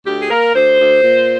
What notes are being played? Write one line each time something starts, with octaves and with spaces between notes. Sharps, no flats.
D2 G4
G#4
A#3 A#4
D2 C5
D2
A#2